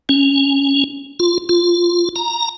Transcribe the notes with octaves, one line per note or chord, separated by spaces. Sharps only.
C#4
F4
F4
A#5